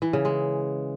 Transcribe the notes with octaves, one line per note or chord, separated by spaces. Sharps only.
E3
C#3
G#3